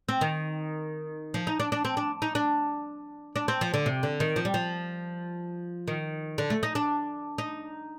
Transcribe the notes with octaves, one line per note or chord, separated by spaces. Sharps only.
C4
D#3
F3
D#4
D4
D4
C4
D4
D#4
D4
D4
C4
F3
D3
C3
D3
D#3
F3
G3
F3
D#3
D3
A3
D#4
D4
D#4